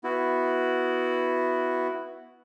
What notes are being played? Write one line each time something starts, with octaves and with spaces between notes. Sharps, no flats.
B3 E4 F#4